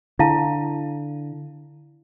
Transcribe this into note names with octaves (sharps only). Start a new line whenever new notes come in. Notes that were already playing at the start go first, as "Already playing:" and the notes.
D3 E4 F5 A5